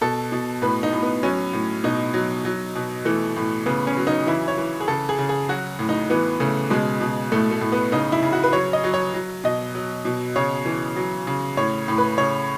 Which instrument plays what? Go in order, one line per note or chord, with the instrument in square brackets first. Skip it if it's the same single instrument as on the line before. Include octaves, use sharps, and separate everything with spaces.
[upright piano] B2 A4
B2
A2 B4
D#4
A2
B3
F#3 C#4
A2
B2 D#4
F#3
F#3
B2
E3 A3
A2
C#3 B3
C#4
F#3
D#4
E3 E4
C#5
E3
G#4
C#3 A4
G#4
C#3
G#4
F#3 F#4
A2
D#4
E3 B3
C#3 A3
B2 G#3
B2
A2 A3
A3
A2
B3
C#3 D#4
E4
C#3
F#4
B4
F#3 C#5
D#5
F#3
C#5
F#3
B2 D#5
F#3
B2
C#3 C#5
E3
F#3
C#3
A2 C#5
A2
B4
C#3 C#5